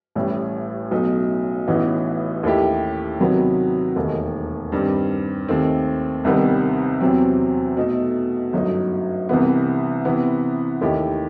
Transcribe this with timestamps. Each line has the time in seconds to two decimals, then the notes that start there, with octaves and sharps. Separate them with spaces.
0.15 A1 A2 G3
0.91 B1 B2 A3 D#4
1.68 A1 A2 E3 B3 D#4
2.43 D#2 D#3 A3 E4 G4
3.20 C3 D#3 F#3 B3
3.96 E1 D#2 D#3 A3
4.72 G2 D#3 G3 C4
5.48 D#2 D#3 A3 C4
6.24 C2 C3 D#3 G3 B3
7.01 E2 C3 F#3 C4
7.77 B2 A3 D#4 A4
8.53 G1 F#2 F#3 A3 D#4
9.29 C2 C3 E3 B3
10.05 C3 E3 B3
10.81 D#2 D#3 A3 E4 G4